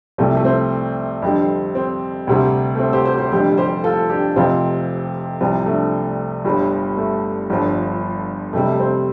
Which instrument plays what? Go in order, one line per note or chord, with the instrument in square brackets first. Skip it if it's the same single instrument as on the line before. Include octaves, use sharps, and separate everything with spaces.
[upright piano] C2 C3 F3 A3
A3
C4
F2 D3 G3
C4
D2 C3 G3
A3
C4
G4 C5
G4 C5
G4 C5
F1 F2 D3 G3 G4 C5
G4 C5
F4 A4
D4 G4
F1 F2 C3 C4 F4
C2 C3 F3
A3 D4
G1 G2 G3
A3
G1 G2 D3 F3
F2 C3 G3 A3
C4